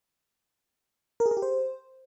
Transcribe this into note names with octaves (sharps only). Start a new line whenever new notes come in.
A#4
G#4
A#4
G4
C5